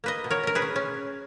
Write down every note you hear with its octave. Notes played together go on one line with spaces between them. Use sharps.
A#3 B4 D#5
B2
A#4 C#5
C#4 A#4
G#4 B4
C#4
C#4